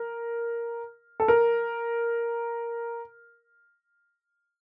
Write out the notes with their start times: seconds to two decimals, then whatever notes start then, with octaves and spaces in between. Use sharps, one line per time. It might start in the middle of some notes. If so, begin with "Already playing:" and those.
Already playing: A#4
1.20 A4
1.28 A#4